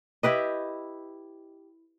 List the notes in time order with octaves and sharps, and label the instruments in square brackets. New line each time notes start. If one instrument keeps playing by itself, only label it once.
[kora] E4 G4 B4 D#5